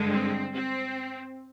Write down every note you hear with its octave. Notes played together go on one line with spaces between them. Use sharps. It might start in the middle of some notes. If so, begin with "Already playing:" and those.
Already playing: G2 D3 G#3
C4
C4